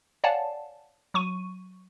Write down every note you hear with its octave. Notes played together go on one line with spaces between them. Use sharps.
C#5 D5 F5 F#5 G#5 A5
F#3 C#6 D#7